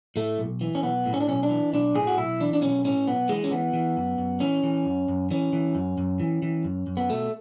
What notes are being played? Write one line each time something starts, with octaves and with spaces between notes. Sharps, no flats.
A2 A3
B1
E3
C#4
B1 B3
A2
C#4
D4
B1 C#4
D4
E3
B1 D4
A2 G#4
F#4
B1 E4
E3 D4
D4
B1 C#4
A2 C#4
B1 B3
E3 G#3
C#4
E3 B3
E3
F#2
F#2
E3 C#4
E3
F#2
F#2
E3 C#4
E3
F#2
F#2
E3
E3
F#2
F#2
B3
B2 A3